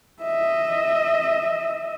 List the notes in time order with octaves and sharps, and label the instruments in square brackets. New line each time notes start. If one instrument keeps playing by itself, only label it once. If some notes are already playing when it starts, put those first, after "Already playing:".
[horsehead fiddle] D#5 E5